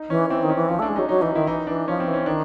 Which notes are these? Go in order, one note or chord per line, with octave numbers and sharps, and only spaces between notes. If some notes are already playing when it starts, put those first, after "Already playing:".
Already playing: D#4
E3 C#4
E3 C4
D#3
C#4
E3
F3 C#4
A3 D4
G#3
F#3 D#4
F#3 D#4
E3 D#4
D#3 E4
E3 D#4
E3 D4
F3 C#4
C4
E3
C#4
D#3 D4